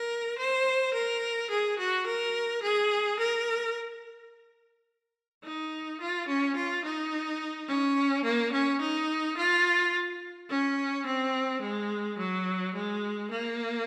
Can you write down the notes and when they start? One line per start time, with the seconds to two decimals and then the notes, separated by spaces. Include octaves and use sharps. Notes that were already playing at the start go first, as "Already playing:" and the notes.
Already playing: A#4
0.38 C5
0.94 A#4
1.50 G#4
1.78 F#4
2.06 A#4
2.62 G#4
3.19 A#4
5.44 D#4
6.00 F4
6.28 C#4
6.56 F4
6.85 D#4
7.68 C#4
8.24 A#3
8.52 C#4
8.81 D#4
9.37 F4
10.50 C#4
11.06 C4
11.61 G#3
12.18 F#3
12.74 G#3
13.31 A#3